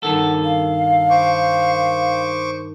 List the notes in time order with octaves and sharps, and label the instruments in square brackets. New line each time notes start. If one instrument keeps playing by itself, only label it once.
[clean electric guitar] G2 D#3 A4 [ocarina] F#5
[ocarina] F5
[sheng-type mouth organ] C5 C#6 D6